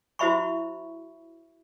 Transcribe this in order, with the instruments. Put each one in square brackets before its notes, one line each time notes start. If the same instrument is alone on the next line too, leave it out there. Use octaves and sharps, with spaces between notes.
[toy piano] E4 F#4 C5 E5 B5 C#6